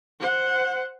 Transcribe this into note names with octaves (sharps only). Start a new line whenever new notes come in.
C5 F#5